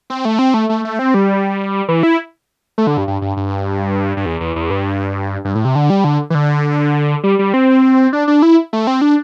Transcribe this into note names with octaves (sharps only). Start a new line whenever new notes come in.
C4
A3
C4
A3
A3
A3
C4
G3
E3
E4
A3
D3
G2
G2
G2
G2
G2
E2
E2
E2
G2
G2
A2
C3
D3
G3
D3
E3
D3
G3
G3
C4
D4
D4
E4
A3
C4
D4